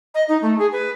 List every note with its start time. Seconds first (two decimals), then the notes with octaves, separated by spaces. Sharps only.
0.14 D#5
0.28 D#4
0.42 A3
0.58 G#4
0.72 B4